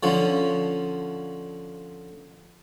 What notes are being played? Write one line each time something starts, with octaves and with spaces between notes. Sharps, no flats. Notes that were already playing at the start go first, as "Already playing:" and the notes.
D3 F3 C#4